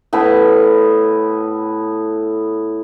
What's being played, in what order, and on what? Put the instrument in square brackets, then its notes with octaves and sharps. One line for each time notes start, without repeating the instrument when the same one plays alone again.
[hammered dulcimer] A2 B3 A5 B5